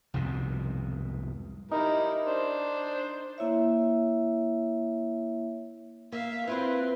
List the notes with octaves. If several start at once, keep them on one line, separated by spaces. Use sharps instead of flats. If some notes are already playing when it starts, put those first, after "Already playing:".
C2 F2 G#2 B2
G3 D#4 E4 A#4
D4 C5
A#3 E4 C#5 E5
A#3 E5 F5
C4 E4 F4 B4 C5